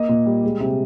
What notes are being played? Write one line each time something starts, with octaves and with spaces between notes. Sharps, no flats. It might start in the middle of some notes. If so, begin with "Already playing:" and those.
Already playing: A#3 D#5
A#2
G3
G#3
C3